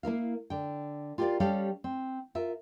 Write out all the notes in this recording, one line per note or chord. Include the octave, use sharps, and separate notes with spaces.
A#3 E4 A#4 F5
D3 G5
F4 G4 A#4 B4 D5 F5
G3 C#4 G4 A4 F5
C4
F4 A#4 E5